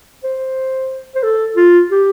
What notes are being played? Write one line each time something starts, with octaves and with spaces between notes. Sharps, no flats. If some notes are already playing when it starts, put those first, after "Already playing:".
C5
C5
A4
F4
G4